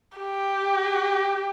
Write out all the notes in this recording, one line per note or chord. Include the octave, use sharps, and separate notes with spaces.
G4